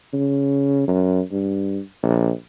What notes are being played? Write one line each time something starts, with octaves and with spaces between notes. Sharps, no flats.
C#3
F#2
G2
A#1